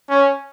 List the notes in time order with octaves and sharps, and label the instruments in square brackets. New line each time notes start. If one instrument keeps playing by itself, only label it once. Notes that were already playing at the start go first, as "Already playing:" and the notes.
[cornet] C#4